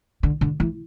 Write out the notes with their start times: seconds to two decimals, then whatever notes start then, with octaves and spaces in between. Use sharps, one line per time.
0.23 D3
0.41 D3
0.60 E3